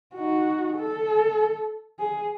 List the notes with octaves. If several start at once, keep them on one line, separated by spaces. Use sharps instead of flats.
D#4 F#4
A4
G#4